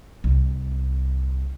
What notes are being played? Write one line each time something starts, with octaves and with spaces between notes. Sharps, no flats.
C2